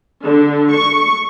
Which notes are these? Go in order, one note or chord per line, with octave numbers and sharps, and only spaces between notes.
D3
C#6